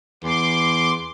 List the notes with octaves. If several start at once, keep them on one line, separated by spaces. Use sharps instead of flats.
E2 C6 D6